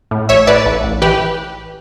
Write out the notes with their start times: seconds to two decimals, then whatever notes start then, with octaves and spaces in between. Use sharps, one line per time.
0.11 A2
0.29 A1 C#5 E5
0.47 A2 B4 D5
0.66 A1
0.84 A1
1.02 E3 G4 B4